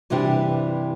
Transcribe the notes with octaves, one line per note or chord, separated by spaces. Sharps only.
G2 C3 E3 G3 D4 G4